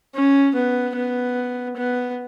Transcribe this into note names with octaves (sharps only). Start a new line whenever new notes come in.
C#4
B3
B3
B3